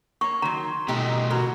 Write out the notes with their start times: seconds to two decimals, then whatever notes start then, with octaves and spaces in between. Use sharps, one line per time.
0.21 A#3 C#5 C#6
0.42 D#3 F#3 A#5 C6
0.88 B2 G#3 A3 D#4 G4
1.31 E3 F#4 A#4